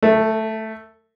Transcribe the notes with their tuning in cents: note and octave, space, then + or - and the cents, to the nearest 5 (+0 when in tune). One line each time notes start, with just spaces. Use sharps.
A3 +0 A4 +45